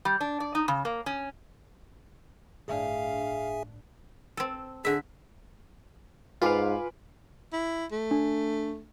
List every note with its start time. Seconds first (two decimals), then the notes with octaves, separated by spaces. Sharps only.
0.05 G3
0.21 D4
0.40 D5
0.55 D#4
0.68 C#3
0.85 A#3
1.06 C#4
2.68 G1 A2 D4 G#4 E5 F5 G#5
4.37 C4 A4
4.85 D3 G#4 E5
6.42 G#2 F4 B4 F5 G#5 D6
7.53 E4
7.92 A3
8.11 D4